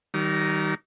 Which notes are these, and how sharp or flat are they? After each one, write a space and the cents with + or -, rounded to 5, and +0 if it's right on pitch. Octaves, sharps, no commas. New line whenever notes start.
D#3 +0 G3 -40 A#5 +0